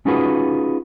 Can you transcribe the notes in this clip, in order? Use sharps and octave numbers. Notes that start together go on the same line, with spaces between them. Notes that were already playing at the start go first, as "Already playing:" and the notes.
C#4 D#4 F4 F#4 G#4 B4